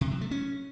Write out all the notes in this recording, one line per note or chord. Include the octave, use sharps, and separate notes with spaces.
C3
F#3
A3
C#4